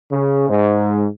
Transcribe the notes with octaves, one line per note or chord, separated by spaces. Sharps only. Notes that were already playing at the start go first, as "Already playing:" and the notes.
C#3
G#2